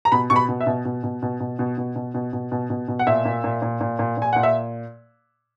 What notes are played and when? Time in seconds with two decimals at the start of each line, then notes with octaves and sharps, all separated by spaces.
0.05 A#5
0.12 B2 B5
0.30 B2 C#6
0.36 B5
0.49 B2
0.61 E5
0.67 B2
0.85 B2
1.04 B2
1.22 B2
1.40 B2
1.59 B2
1.78 B2
1.96 B2
2.14 B2
2.33 B2
2.52 B2
2.70 B2
2.88 B2
2.99 F#5
3.07 A#2 E5
3.25 A#2
3.44 A#2
3.62 A#2
3.81 A#2
3.99 A#2
4.17 A#2 G#5
4.33 A#2 F#5
4.43 E5